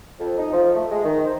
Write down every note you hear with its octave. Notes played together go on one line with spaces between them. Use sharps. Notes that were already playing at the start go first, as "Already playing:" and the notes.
F2
D#4
F3
A3
G#3
D#3
C5